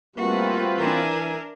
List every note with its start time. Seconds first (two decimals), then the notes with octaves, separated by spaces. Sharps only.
0.17 G3 A3 A#3 C4 F4 F#4 B4
0.79 E3 D4 A#4 E5 G#5